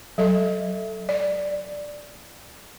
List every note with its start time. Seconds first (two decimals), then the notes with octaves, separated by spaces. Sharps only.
0.18 F#3 A4 D#5
1.09 D5